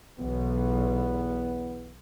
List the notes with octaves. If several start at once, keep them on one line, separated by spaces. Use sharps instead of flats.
B1 E2 B3